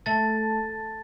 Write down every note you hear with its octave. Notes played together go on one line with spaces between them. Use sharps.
A3 A5 A6